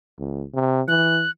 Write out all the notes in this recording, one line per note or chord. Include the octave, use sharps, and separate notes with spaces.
C#2
C3
E3 F#6